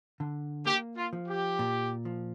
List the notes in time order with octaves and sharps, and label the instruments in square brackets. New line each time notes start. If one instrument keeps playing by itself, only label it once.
[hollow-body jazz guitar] D3
[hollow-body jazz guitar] A#3 [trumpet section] G4
[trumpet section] F4
[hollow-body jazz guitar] F3
[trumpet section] G4
[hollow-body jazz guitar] A#2
F3